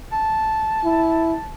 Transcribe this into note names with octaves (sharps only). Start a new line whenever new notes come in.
A5
E4